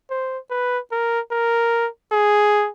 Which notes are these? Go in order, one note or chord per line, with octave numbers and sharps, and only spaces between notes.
C5
B4
A#4
A#4
G#4